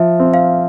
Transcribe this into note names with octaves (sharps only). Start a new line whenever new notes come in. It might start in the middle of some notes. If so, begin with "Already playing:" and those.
Already playing: F3 E5
C4
F5